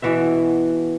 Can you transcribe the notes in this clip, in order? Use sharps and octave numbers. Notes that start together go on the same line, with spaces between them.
B2 E3 F#4 E5